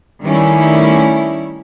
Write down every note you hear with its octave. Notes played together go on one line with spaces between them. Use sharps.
D#3 G3 A3 C#4 E4